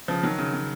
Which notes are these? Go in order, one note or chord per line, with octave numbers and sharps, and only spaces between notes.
C#3 F3
D#3 F#3
C#3
C#3